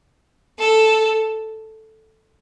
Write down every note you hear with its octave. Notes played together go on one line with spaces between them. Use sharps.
A4